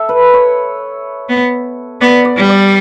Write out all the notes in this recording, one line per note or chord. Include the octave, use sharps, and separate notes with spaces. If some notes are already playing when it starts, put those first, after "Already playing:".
Already playing: A4 E5
B4
C#5
B3
B3 D5
D5
G3
D5